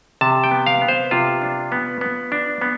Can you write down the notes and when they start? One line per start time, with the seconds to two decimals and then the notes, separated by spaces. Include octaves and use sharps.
0.21 C3 A5
0.44 G5
0.51 B3
0.66 F5
0.82 B3
0.88 C5
1.11 C3 F4
1.42 D4
1.72 B3
2.01 B3
2.32 D4
2.62 B3